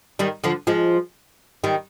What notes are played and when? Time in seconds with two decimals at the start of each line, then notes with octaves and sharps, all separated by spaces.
0.19 D#3 G3
0.44 D3 F3
0.67 F3 G#3
1.64 D#3 G3